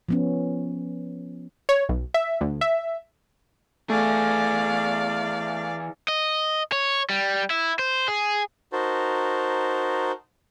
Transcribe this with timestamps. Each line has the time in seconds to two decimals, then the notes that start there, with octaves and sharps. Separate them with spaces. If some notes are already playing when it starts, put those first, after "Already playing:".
0.09 F3 B3 C#4
1.69 C#5
1.89 B1
2.14 E5
2.41 D2
2.61 E5
3.90 E3 A3 G#4 D5 F5
6.08 D#5
6.72 C#5
7.10 G3
7.50 E4
7.79 C5
8.08 G#4
8.73 D#4 F#4 A#4 C5 A5